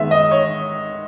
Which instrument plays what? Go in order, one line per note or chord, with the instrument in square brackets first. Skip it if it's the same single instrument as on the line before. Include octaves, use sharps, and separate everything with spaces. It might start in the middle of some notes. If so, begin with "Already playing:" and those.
Already playing: [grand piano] D#3 G#3 B3 E5
D#5
C#5